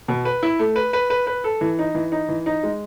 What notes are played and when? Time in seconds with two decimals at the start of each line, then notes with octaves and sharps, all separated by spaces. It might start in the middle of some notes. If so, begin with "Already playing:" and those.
0.08 B2
0.25 B4
0.43 E4
0.59 A3
0.76 B4
0.93 B4
1.10 B4
1.27 B4
1.44 A4
1.61 E3
1.79 D#4
1.95 E3
2.12 D#4
2.29 E3
2.46 D#4
2.63 G#3